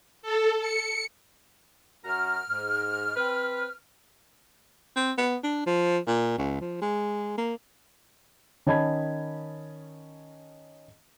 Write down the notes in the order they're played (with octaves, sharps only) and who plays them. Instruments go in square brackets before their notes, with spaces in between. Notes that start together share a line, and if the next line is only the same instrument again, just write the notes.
[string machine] A4
C#7
[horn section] F#2 F#4 A#5 [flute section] F6
[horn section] G#2
C4 B4
[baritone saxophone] C4
B3
D4
F3
A#2
C#2
F3
G#3
A#3
[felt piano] D#3 C#4 D#5 A5 B5 G#6